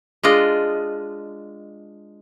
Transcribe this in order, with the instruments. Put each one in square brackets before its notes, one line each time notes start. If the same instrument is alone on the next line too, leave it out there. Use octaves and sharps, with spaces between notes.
[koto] G#3 D4 F4 D#5